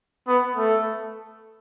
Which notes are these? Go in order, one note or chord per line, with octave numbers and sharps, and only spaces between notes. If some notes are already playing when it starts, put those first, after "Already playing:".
B3
A3